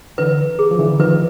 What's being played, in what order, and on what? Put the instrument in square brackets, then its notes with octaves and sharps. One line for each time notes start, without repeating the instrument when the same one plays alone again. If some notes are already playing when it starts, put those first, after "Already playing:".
[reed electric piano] D3 E3 [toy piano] B4
[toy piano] G#4
[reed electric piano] F3
D3 E3
[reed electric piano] D#3 F3 [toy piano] B4